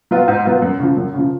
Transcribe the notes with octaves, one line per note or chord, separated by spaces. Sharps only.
F#3 B3 F4
G#2
F#3 B3 F4
F#2
C#3 F3
F#2
C#3 F3